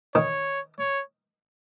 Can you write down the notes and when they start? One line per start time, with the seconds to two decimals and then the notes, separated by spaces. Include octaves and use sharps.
0.15 D#3 C#5
0.79 C#5